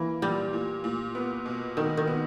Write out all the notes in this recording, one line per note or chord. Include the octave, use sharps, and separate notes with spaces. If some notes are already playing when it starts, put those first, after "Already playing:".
Already playing: E3 A#3
A#2 G3
A#2
A#2
B3
B2
B2 D#3
D#3
B3